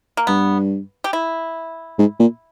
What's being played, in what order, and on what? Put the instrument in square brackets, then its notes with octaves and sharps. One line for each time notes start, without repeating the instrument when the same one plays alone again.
[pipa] A#3
[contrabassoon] G2 [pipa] B3
[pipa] G4
E4
[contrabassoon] G#2
A#2